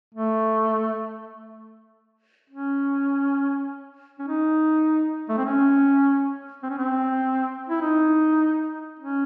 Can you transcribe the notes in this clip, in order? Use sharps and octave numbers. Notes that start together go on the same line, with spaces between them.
A3
C#4
C#4
D#4
A3
C4
C#4
C4
C#4
C4
E4
D#4
C#4